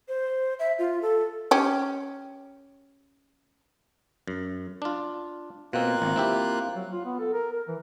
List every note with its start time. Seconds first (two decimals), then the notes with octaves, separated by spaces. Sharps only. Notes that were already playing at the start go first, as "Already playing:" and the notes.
0.08 C5
0.59 E5
0.79 F4
1.02 A4
1.51 C#4 G4
4.28 F#2
4.82 D4 F4
5.73 B2 A#3 C4 F4 F#6
6.02 G#1
6.16 C4 E4 G4
6.76 F#3
6.92 F4
7.05 B3
7.19 A4
7.33 A#4
7.52 A#4
7.68 E3